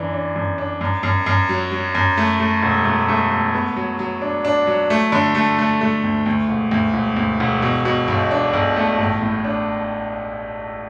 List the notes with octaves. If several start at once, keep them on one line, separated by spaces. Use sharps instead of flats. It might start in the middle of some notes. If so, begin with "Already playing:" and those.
Already playing: F#2 E3 D4
D4
F#2
D4
F#2
F#2
F#2
F#3
F#3
F#2
A3
A3
E1
A3
A3
A3
B3
F#3
F#3
D4
D4
F#3
A3
D3
A3
A3
A3
D2
D2
E1
D2
E1
D2
E1
B2
B2
B1
D4
B1
A3
A1
A2
D4